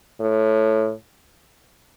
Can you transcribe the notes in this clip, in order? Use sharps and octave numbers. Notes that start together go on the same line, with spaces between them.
A2